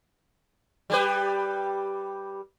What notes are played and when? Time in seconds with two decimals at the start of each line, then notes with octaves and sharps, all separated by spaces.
0.90 G3 G4 B4